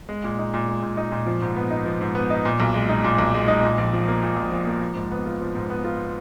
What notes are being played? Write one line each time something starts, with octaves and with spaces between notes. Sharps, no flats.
G#3
A#2
D#4
A#2
G#3
A#2
D#4
A#2
F3
G#2
B3
D#4
F3
G#2
B3
D#4
A#2
B1
G#3
D#4
A#2
B1
G#3
D#4
A#2
A#1
F3
A#3
A#2
A#1
F3
A#3
F3
G#2
B3
F4
F3
G#2
B3
F4